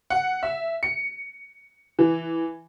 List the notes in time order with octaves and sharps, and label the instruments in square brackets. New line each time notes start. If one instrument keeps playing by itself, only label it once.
[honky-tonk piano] F#5
E5
C#7
E3